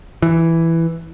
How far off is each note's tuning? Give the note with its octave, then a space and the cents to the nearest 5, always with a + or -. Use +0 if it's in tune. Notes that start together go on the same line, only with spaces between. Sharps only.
E3 +5